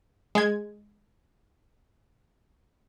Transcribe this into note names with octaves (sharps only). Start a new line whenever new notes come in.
G#3 G#6